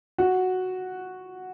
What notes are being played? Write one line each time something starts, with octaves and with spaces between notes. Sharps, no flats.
F#4